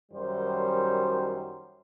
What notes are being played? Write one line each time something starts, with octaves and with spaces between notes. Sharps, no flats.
F#2 D#3 G3 F#4 C5